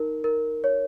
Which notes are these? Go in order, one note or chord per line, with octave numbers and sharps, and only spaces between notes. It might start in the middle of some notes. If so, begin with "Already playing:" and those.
Already playing: D#4 A#4
A#4
C#5